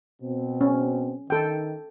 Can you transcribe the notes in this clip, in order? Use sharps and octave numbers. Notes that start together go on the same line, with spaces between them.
B2 C4
C#4
D#3 A4 G5